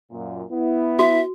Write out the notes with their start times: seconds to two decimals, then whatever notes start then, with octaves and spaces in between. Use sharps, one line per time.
0.11 F#2 A#2
0.51 B3 E4
0.99 F#4 E5